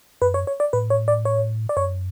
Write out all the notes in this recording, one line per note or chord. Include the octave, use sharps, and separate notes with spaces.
F#2 B4
C#5
C#5
D5
A2 B4
C#5
D5
C#5
D5
F#2 C#5